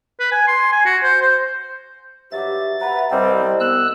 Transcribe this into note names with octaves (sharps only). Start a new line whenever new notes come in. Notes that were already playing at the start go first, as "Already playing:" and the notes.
B4
G#5
C6
G#5
F#4
C5
C5
G2 F#3 G4 E5 A6
B4 E5 F#5 A#5
C2 G3 C4 D#5
B3 E6 F#6